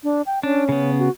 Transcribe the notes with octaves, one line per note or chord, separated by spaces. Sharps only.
D4
G5
C#4 D4
C#3 B3
F#4